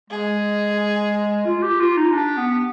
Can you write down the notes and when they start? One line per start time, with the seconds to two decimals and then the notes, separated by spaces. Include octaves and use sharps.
0.10 G#3 G#4
1.45 F4
1.62 G4
1.80 F4
1.97 D#4
2.13 D4 G4
2.37 B3